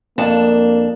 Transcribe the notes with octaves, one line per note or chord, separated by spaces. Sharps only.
F2 A#3 D4 A5